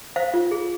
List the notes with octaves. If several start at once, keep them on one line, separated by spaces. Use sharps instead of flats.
C5 F5
F4
G#4